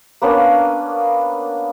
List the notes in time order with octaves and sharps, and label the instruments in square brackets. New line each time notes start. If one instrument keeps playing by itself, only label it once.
[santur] A#3 B3 C#4 D4